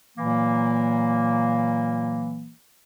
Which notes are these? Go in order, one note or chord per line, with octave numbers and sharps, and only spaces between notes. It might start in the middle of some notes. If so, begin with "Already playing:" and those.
A#2 E3 F#3 A#3